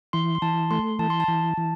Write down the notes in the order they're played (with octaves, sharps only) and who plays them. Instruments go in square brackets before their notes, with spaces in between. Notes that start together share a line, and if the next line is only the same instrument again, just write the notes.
[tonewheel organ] E3 [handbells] C6
[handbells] C6
[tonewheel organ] E3 [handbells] A5
[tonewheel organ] A3 [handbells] C6
[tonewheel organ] E3 [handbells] A5
[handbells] C6
A5
[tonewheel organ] E3
E3